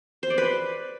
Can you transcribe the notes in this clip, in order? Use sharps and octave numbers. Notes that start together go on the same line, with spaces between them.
C5
D5
B4